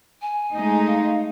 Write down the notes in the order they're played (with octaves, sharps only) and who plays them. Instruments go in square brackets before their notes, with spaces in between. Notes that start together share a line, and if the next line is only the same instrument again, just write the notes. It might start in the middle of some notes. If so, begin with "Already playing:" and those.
[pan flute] G#5
[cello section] G#3 A3 D#4
[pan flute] F5